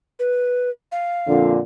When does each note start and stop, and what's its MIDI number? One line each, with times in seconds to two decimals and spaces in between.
0.19 0.70 71
0.92 1.52 77
1.27 1.59 41
1.27 1.59 46
1.27 1.59 50